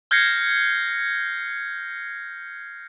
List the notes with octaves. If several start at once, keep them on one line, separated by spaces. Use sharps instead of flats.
F6 G6 G#6 A#6 C7 C#7